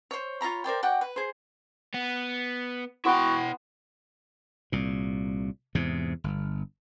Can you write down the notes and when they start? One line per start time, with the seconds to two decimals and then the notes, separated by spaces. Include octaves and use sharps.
0.11 C5 C#5
0.41 F4 C#5 A#5 B5
0.64 A#4 C5 D5 G5
0.83 F#4 D5 F#5 G5
1.01 B4
1.16 G#4 C5
1.94 B3
3.05 B3 E4 F#4 G5 C6
4.72 C2 A#2
5.75 E2 G#2 C3
6.24 G1